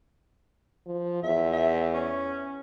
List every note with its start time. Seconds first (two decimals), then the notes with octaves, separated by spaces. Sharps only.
0.87 F3
1.24 E2 E5
1.53 E5
1.94 C#4